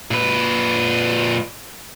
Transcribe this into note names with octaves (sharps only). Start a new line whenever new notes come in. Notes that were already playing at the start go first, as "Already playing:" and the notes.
A#2 B4